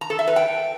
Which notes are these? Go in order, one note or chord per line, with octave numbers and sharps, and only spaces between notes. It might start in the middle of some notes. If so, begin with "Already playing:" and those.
A#5
A4
E5
B4
G5